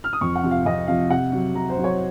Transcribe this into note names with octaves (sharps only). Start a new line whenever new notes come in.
F6
D#6
F2 C#6
F#5
C3 F3
F5
F2 D#5
C3 F3 F5
C3 F#5
F#3
C3 A#5
C5
F#3
C#5